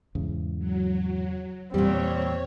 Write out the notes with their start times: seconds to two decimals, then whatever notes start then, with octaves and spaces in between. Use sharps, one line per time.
0.15 E2 G#2 C#3
0.59 F#3
1.74 E2 A#2 G3 C4 C#5